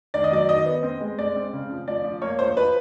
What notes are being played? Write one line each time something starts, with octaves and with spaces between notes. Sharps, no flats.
D#3 D5
D#5
F#3 D5
D#3 D#5
B3
C4
G#3
G#3 D5
C4
C#3
F3
F3 D5
F3
A#3 C#5
F3 C5
F3 B4